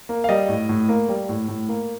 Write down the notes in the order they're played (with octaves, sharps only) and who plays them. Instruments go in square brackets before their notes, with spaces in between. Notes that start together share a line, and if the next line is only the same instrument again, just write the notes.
[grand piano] A#3
F5
G3 D#5
A2
A2
A#3
G3
A2
A2
A#3